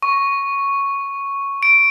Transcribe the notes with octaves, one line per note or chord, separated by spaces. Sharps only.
C#6
D7